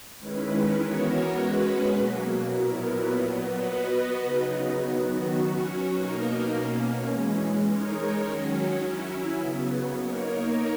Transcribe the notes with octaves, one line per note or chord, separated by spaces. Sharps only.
D#3 G#3 C#4 E4 B4
E3 B3 F#4 A#4 C#5
G#3 C#4 F#4 B4
B2 F#3 A#3
A#2 F#3 B3 E4 A#4
A#2 F#3 B3
B3 F#4 B4 D#5
C#3 F#3 B3 D#4
D#3 F#3 B3 F#4
F#3 C#4 F#4 C#5
B2 A#3 D#4 A#4
B2 A#3 C#4
E3 G#3 C#4
G#3 D#4 A#4 C#5
D#3 F#3 C#4
F#3 C#4 E4
C#3 F#3 B3
A#3 D#4 A#4 C#5